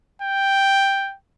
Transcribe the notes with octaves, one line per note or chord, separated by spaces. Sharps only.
G5